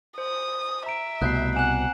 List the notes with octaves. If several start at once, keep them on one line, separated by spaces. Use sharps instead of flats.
C5 D#6
E5 A#5 D7
C2 B2 A3 F#6 G6 C7
C4 F#5 G#5 F#6 E7